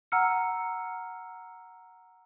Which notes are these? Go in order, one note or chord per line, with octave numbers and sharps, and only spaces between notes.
F#5 A#5 E6 F6 C#7